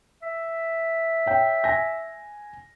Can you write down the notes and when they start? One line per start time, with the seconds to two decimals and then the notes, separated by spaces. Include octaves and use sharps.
0.22 E5
1.26 C#5 G5
1.64 G#5 A#6